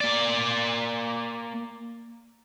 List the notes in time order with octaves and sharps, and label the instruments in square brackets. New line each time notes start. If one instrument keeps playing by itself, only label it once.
[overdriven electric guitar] A#3 D5